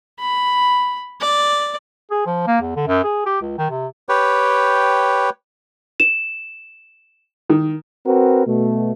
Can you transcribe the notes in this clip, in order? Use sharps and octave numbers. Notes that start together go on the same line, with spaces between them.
B5
D5
G#4
F3
A#3
E2
D3
F#2
G#4
G4
C#2
D#3
C3
G4 B4 C#5 G5
E7
D#3
C4 F#4 A#4 B4
B2 A3